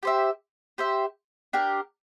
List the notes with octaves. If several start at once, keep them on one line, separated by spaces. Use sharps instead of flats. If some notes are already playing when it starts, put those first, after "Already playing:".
G4 C5 E5
G4 C5 E5
D4 G4 A#4